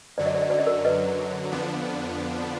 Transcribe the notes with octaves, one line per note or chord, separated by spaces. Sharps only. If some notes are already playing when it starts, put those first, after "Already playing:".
F#2 D3 F#3 D5
D#5
D5
D#5
D5
D#5
A#4 D5
B4 D#5
F2 D3 F3 B3 D4